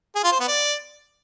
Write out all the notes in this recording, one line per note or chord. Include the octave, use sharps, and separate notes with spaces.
G#4
F4
C5
B3
D5